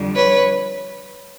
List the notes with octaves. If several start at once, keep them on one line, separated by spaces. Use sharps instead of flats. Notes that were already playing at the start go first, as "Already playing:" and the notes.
Already playing: F2 D3 G3
B4 C#5